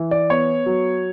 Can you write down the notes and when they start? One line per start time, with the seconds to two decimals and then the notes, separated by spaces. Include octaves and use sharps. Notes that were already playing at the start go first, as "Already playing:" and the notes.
Already playing: E3
0.11 D5
0.30 B3 C#5
0.66 F#3